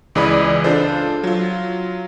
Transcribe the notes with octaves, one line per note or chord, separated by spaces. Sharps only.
C#2 E3 G#4 D5 D#5 B5
D4 F4 A4 C5
F#3 F4